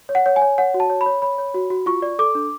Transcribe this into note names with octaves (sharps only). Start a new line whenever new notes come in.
C#5
F#5
C#5
G#5
C#5
C#5 F#5
F#4
A5
C#5
B5
C#5
C#5 B5
C#5
F#4
F#4
F4 C#6
D5
A4 D6
D4